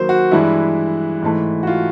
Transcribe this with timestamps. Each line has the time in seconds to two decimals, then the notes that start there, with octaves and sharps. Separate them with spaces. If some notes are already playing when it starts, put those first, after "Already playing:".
Already playing: D#3 F#3 A#3 C5
0.09 F#4
0.31 G2 E3 G#3 E4
1.22 G#2 E3 A3
1.63 F#4
1.67 F4